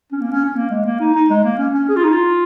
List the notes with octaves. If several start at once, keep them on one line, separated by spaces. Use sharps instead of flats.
C#4
A#3
C#4
C#4
A#3
G#3
A#3
D#4
D#4
G#3
A#3
C#4
C#4
G#4
F4
D#4
F4